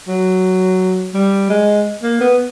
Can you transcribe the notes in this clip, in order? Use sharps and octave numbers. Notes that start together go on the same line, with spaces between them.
F#3
G3
G#3
A#3
B3